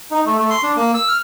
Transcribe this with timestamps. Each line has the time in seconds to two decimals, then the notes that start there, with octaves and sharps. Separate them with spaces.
0.11 D#4
0.26 A3
0.39 A3
0.50 C6
0.63 D4
0.77 A#3
0.94 E6
1.08 F6